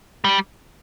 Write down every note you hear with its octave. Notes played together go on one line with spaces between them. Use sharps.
G3